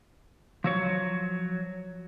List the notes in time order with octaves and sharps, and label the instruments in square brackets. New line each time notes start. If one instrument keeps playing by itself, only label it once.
[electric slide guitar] F3 F#3 C#5